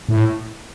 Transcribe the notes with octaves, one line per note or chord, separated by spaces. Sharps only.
A2